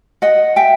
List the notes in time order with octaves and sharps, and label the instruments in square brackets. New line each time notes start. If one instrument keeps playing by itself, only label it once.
[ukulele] D#5 F#5
E5 G5